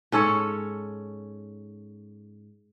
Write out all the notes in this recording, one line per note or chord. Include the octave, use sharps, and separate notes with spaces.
G#2 C#4 A4 C#5